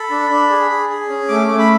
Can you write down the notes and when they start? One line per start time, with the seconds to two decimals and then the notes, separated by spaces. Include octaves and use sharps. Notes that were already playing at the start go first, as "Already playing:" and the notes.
Already playing: A4 B5
0.11 D4
0.30 D4
0.50 G#4
0.70 G#4
0.89 G#4
1.09 C#4
1.29 A3 D6
1.49 A3
1.59 B5